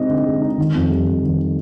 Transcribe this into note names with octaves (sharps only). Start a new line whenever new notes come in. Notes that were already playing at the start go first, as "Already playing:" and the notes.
Already playing: C3 G#3 C4 D#4 D#5
D3
G#3
D#4
D#3
F2
G3
F2
D#3